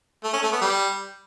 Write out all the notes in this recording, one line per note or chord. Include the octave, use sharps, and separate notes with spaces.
A3
C#4
A3
B3
G3